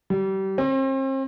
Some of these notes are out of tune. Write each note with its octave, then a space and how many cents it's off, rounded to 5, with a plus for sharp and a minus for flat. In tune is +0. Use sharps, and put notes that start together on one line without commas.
G3 -30
C4 +40